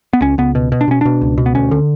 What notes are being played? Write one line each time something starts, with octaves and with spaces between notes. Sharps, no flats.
B3
C#2 C#4
C#2 B3
B2
B2
D4
B2 C#4
B2 D4
C#2
B2
B3
D2 C#4
D3